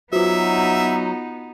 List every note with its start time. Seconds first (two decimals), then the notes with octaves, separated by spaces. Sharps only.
0.13 F#3 B3 D#4 F4 F#4 E5